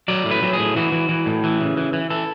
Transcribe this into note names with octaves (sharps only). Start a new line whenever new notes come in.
F#3 D5
A2
B4
F#3
G#4
A2
E3 F#4
E3
E3
A2
E3
C#3
E3
E3
E3 A4